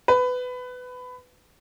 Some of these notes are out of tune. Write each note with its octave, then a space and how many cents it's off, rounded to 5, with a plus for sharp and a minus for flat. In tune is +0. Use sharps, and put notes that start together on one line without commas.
B4 +20